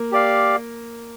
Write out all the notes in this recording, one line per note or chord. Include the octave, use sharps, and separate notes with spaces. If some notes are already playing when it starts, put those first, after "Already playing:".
Already playing: A#3
G4 D5 F5